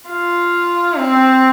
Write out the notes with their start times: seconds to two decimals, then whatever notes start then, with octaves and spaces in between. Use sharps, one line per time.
0.09 F4
0.98 C4